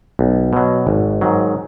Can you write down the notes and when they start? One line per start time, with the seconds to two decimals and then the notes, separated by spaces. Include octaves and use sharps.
0.19 B1
0.53 B2 F#3
0.87 G#1
1.21 G#2 D#3 F#3